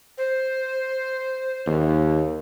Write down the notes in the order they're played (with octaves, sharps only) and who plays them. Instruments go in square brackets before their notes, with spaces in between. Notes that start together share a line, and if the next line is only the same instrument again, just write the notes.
[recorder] C5
[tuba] D#2